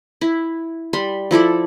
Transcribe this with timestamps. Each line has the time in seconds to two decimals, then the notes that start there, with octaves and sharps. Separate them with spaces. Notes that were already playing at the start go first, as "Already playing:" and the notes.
0.21 E4
0.93 G3 B5 C6
1.31 F3 E4 A4 D5